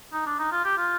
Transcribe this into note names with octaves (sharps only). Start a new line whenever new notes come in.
D#4
D4
D#4
F4
G4
F4